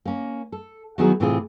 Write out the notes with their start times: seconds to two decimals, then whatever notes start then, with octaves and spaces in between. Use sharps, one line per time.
0.05 A#3 C#4
0.52 A4
0.98 D#3 F#3 B3 E4 F#4 G#4
1.20 A2 C3 E3 C4 F4 G#4